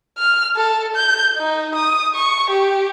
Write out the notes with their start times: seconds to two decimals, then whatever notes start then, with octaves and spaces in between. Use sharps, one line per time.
0.18 F6
0.57 A4
0.96 G6
1.38 D#4
1.75 D#6
2.15 C#6
2.50 G4